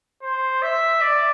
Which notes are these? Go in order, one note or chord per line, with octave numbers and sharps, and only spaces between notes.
C5
E5
D5